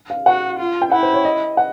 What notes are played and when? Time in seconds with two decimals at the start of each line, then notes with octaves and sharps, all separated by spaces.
0.10 F5
0.26 F#4 F#5
0.59 F4
0.82 G5
0.92 E4 F#5
1.03 C5
1.14 C#5
1.25 D#5
1.57 F#5